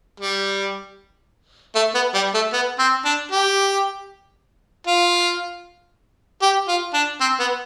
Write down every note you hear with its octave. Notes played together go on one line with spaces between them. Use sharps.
G3
A3
B3
G3
A3
B3
C4
D4
G4
F4
G4
F4
D4
C4
B3